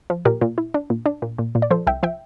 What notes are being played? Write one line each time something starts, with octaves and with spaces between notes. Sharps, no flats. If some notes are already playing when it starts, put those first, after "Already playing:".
F3
A#2 G4 A#4
A#2
E4
D4
A#2
D4
A#2
A#2
A#2
D5
F3 A4 C5
C2 E5 G5
F3 E5 G5